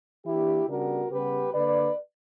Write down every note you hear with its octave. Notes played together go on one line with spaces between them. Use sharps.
E3 A#3 D4 E4 G4
C#3 G3 B3 D4 F#4 A#4
C#3 G3 B3 G4 B4
D3 A#3 D4 B4 D5